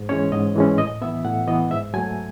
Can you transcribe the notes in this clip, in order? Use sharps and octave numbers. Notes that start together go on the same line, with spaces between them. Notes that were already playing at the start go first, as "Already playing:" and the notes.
Already playing: G#2
E3 G#3 C#4 C#5
G#2 D#5
E3 G#3 C#4
A2 D#5
E3 B3 E5
A2 F#5
E3 B3 D#5
G#2 E5
F#3 A3 G#5